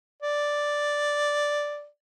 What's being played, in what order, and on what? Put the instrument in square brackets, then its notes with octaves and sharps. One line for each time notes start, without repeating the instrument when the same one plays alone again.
[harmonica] D5